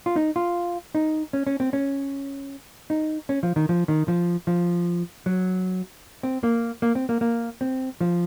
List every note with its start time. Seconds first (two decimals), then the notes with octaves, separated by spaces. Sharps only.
0.06 F4
0.16 D#4
0.36 F4
0.95 D#4
1.33 C#4
1.47 C#4
1.60 C4
1.73 C#4
2.90 D#4
3.29 C#4
3.43 F3
3.56 D#3
3.69 F3
3.88 D#3
4.08 F3
4.47 F3
5.26 F#3
6.23 C4
6.43 A#3
6.82 A#3
6.95 C4
7.09 A#3
7.21 A#3
7.61 C4
8.01 F3